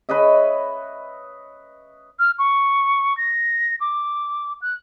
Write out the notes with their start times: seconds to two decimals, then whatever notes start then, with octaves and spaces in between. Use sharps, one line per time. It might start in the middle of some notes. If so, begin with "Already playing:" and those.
0.09 B4 C#5 D#5 E5
2.19 F6
2.39 C#6
3.17 A#6
3.81 D6
4.62 F#6